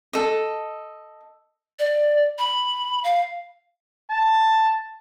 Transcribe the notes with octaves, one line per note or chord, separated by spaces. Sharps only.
A4 D#5
D5
B5
F5
A5